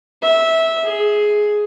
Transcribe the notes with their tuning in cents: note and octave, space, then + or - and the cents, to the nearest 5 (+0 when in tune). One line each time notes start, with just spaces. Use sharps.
E5 -15
G#4 +10